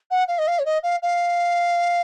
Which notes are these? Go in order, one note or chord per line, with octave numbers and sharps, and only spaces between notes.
F#5
F5
D#5
F5
C#5
D#5
F5
F5